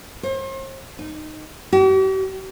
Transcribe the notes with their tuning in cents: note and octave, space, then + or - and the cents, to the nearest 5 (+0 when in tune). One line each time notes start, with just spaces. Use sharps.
C5 +40
D#4 -15
G4 -45